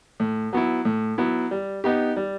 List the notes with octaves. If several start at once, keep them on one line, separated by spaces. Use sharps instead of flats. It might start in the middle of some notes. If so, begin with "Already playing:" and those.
A2
F#3 B3 E4
A2
F#3 B3 E4
G3
B3 D#4 G4
G3